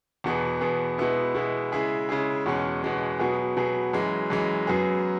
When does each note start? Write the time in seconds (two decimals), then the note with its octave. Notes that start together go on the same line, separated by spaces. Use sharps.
0.24 E2 B2 B3 G#4
0.61 E2 B2 B3 G#4
0.98 B2 G#3 B3 E4
1.35 B2 G#3 B3 E4
1.72 C#3 G#3 E4 G#4
2.09 C#3 G#3 E4 G#4
2.46 E2 B2 G#3 C#4
2.83 E2 B2 G#3 C#4
3.19 B2 F#3 B3 G#4
3.57 B2 F#3 B3 G#4
3.93 F#2 E3 G#3
4.30 F#2 E3 G#3
4.67 F#2 F#3 B3 G#4